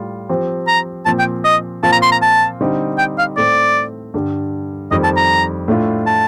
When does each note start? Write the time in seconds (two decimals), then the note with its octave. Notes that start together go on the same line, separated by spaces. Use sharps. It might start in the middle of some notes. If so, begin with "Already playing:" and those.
Already playing: A2 G3 F4
0.29 F3 C4 G4
0.68 A#5
1.06 A#2 F3 C4 A5
1.19 G5
1.45 D#5
1.83 A#2 F3 C4 F4 A5
1.92 A#5
2.02 C6
2.12 A#5
2.22 A5
2.61 D3 G3 C4 D#4 G4
2.99 G5
3.18 F5
3.37 A2 A3 C4 D5
4.14 G2 D3 G3
4.91 F2 D#3 G3 C4 D#5
5.04 A5
5.17 A#5
5.68 A2 A3 D4 F4
6.07 A5